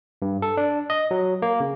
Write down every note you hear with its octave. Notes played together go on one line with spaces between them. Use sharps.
G2
A4
D4
D#5
F#3
A#3
C#3